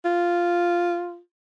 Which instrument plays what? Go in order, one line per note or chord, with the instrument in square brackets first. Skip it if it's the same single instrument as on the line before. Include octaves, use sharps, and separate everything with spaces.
[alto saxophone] F4